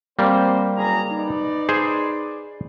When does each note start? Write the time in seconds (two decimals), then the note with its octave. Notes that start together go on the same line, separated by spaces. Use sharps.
0.19 G3 A#3 C4 C5
0.76 F#1 G#4 A#5
1.12 D#4 B4 D5
1.69 G#4 C5